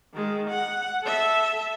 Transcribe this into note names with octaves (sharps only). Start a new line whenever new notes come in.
D#3 G#3
F#5
A4 E5